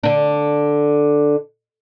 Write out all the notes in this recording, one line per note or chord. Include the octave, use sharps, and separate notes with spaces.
D3 D4